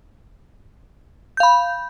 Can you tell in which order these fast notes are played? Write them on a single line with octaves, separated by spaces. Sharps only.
G6 F5 B5